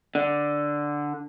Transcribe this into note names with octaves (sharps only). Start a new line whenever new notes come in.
D3